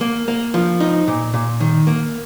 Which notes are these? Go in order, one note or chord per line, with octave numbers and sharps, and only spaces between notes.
A#3
A#3
F3
D#4
A#2
A#2
D#3
A#3